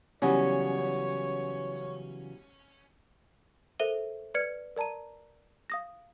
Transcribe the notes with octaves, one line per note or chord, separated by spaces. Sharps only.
C#3 E3 F#3 G3 B3 C#4 C#5
A4 A#4 C5 E5 D#7 G7
B4 D5 F6 G#6 C#7
A#4 D5 A5 A#5 D#7
F5 D#6 A#6